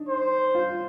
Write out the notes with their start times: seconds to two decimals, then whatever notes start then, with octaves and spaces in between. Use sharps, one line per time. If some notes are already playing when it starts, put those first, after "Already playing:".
Already playing: D4 D#4
0.09 C5
0.55 F4